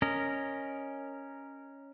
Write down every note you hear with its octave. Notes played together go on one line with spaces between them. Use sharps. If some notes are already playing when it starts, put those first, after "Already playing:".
C#4 A#4 D#5